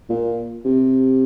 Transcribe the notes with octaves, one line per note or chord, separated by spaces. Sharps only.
A#2
C3